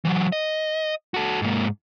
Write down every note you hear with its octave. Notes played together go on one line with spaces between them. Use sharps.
E3 F#3
D#5
F#4 A4
G#2 A#3